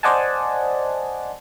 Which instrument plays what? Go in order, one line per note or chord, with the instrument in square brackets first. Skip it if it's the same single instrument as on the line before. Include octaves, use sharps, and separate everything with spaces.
[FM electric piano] C5 D5 D#5 F#5 G#5 A5